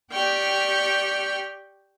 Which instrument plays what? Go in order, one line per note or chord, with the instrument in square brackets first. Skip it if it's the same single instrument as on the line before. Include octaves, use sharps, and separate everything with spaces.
[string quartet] G4 D5 G5 C#6 F6